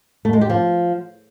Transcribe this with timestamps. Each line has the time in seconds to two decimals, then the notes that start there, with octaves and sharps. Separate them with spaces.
0.25 A3
0.33 G#3
0.41 G4
0.49 F3